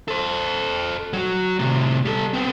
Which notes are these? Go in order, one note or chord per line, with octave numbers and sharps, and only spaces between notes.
A4 C5
F#3 F#4
A2 C3
G3 A4
B3 C4